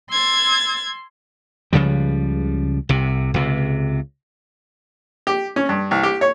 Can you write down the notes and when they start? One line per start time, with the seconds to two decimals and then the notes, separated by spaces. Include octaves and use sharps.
0.10 C6 E6 G#6 A6
1.73 C#2 C#3 F3 G3
2.89 C2 C3
3.34 C#2 C3
5.27 G4
5.56 C#4
5.69 G2
5.91 C2
6.03 G4
6.21 C#5